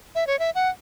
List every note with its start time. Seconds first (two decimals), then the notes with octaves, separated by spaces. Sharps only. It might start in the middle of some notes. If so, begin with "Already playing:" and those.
0.15 E5
0.27 C#5
0.39 E5
0.55 F#5